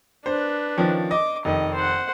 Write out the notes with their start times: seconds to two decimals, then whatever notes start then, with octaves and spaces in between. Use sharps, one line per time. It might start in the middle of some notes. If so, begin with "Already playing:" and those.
0.26 D4 B4 C5
0.77 D#3 F3 C#4
1.11 D#5 D6
1.45 F1 D#3 D#5
1.74 C5 F#5